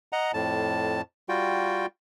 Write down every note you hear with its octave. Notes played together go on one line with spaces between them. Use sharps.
D#5 F#5 A#5
F2 A2 A5
G3 F4 F#4 G5